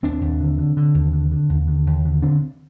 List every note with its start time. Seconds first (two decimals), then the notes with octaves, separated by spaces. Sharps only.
0.03 D#2 C4 D4
0.21 D#2
0.40 D3
0.58 D3
0.77 D3
0.94 D#2
1.13 D3
1.32 D3
1.49 D#2
1.67 D3
1.87 D#2
2.05 D3
2.22 D3 C4 D4